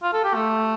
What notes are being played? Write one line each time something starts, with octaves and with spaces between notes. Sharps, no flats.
F4
A4
G4
A3